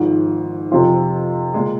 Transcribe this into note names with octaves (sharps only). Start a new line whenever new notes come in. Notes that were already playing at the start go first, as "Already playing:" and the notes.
Already playing: G#1 G#2 F3
F2 C3 F3 C4 F4
A#2 G#3